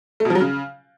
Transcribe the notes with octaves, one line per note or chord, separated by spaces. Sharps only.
A3
B2
F3
F#3
C#3